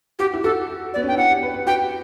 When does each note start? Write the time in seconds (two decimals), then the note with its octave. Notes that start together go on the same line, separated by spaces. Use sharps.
0.19 F#4 G4
0.34 E4
0.44 F#4 A4
0.94 B3 D5
1.03 C#4
1.08 D4 G5
1.18 E4 F#5
1.30 G4
1.43 B4
1.54 B4
1.67 F#4 G5